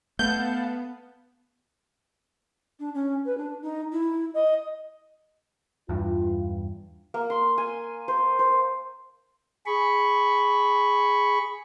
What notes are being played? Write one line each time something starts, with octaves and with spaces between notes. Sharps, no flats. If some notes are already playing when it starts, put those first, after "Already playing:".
A3 B3 F5 F#5 A5 G6
D4
C#4
B4
D4
D#4
E4
D#5
E2 G2 F4
A#3
C6
G#5
C5
C5
G#4 B5 C#6